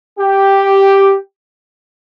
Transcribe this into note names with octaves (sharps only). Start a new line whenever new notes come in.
G4